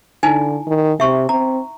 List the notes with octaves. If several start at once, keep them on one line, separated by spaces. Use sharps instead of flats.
D3 D#4 E4 G#5
D#3
C3 E5 C#6
C4 A#5